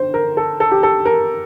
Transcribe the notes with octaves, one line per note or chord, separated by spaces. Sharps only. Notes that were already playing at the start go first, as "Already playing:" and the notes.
Already playing: D3 C5
A#4
A4
A4
G4
A4
A#4